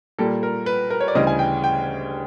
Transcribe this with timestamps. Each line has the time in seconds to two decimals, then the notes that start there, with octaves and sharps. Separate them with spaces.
0.19 A#2 G3 A#3 A4
0.43 A#4
0.66 B4
0.91 A#4
1.00 C#5
1.08 D5
1.15 D2 C#3 E3 G3 D#5
1.27 G#5
1.39 G5
1.64 G5